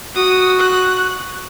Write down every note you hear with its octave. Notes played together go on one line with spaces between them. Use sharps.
F#4 D#6
F#6